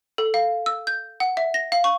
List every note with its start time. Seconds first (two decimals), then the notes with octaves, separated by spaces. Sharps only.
0.18 A4
0.34 F5
0.66 E6
0.87 G6
1.20 F#5
1.37 E5
1.54 A#6
1.72 F5
1.84 C#6